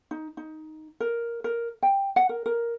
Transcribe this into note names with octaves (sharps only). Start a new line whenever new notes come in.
D#4
D#4
A#4
A#4
G5
F#5
A#4
A#4